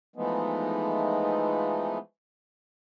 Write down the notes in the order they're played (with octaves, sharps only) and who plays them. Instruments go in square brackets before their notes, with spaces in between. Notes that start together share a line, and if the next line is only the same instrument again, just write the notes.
[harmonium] E3 F3 G#3 A3 B3 D#4